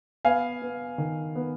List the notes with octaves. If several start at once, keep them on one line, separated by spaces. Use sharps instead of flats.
B3 F5 G#5
B3
D#3
B3